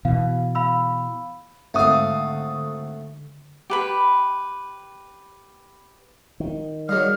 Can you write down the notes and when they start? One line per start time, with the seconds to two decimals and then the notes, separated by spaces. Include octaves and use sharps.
0.05 B2 E3 F5
0.55 F5 B5 E6
1.74 G#1 D3 A3 F5 D#6
3.70 G4 B4 B5
6.40 D#3
6.89 F#3 G3 G#4 D#5 F5 F6